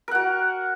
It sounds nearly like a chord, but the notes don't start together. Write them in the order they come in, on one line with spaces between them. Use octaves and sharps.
A#4 F#5 F#4